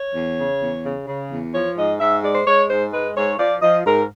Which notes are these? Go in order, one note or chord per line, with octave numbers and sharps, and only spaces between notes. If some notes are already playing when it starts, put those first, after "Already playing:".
Already playing: C#5
E2
C#3
E2
C#3
C#3
E2
F3 C#5
G#2 D#5
G#2 E5
G#3 D5
C5
G#3 C#5
G#2 C5
G#3 B4
G#2 C#5
F3 D5
F3 D#5
G#2 A#4